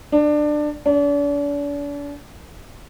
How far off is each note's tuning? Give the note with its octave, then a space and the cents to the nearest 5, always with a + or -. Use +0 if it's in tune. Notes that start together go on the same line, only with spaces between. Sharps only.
D4 +20
D4 -40